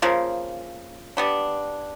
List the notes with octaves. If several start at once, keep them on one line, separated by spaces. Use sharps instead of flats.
C#3 F3 A#3
G3 B3 D4